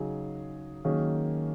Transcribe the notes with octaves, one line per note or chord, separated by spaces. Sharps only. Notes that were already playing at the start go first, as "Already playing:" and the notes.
Already playing: C#3 F#3 D#4 G#4
D#3 F#3 A#3 C#4 G#4